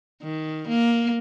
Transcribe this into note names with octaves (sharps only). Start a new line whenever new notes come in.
D#3
A#3